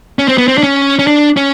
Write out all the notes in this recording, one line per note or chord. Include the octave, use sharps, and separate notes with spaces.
C#4
C4
B3
C4
D4
C#4
C#4
D4
C#4